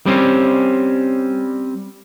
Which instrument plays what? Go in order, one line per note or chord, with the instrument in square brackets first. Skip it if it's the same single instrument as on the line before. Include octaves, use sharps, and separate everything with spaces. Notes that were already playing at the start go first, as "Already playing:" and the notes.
[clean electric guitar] G3 C4 C#4